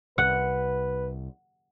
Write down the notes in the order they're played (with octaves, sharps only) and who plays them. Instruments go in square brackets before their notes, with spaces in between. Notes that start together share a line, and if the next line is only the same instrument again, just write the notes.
[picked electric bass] C2 [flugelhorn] B4 [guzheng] F#5